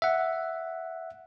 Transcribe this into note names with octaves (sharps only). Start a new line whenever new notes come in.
E5 F#5